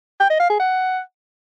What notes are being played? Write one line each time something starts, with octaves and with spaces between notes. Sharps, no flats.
G5
D#5
F5
G#4
F#5